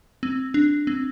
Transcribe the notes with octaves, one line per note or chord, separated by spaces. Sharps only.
C4
D4
C4